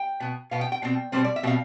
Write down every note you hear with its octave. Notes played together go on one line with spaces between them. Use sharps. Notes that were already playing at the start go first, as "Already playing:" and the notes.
Already playing: G5
B2 B3
B2 B3 F5
G5
G5
B2 G3 C4
B2 G3 C4 C5
D5
E5
B2 G3 C4 F5